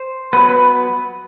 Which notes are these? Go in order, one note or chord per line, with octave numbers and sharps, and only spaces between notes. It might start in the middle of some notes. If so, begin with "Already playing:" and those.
Already playing: C5
F#3 B3 B4
B4